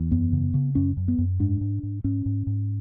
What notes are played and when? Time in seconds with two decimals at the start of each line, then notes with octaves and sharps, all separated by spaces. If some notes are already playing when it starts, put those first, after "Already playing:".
Already playing: E2
0.11 F#2 B3
0.33 C#3
0.54 C#3
0.75 F#2 C#4
0.97 F#2
1.08 B3
1.18 F#2
1.40 G#2 D4
1.61 G#2
1.83 G#2
2.04 G#2 C#4
2.26 G#2
2.47 G#2